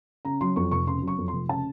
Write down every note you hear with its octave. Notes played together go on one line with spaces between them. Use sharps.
C#3 A#5
F#3 C6
F2 C#6
F1 C#6
C#3 C6
F#3
C#6
F2
C6
F1
C#3 A5